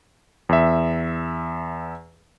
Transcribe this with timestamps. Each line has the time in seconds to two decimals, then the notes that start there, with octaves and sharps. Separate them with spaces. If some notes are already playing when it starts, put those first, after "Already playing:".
0.49 E2 E5